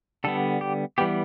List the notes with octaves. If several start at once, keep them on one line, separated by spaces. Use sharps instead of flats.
D3 G3 B3 A4
G4
E3 G3 B3 G4